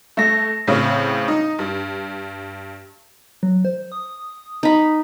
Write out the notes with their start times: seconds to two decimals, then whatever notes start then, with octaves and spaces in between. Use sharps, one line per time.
0.17 A3 A#6
0.67 A2 C#3 C4
1.28 D#4
1.59 G2
3.43 F#3
3.65 C5
3.92 D#6
4.63 D#4 B5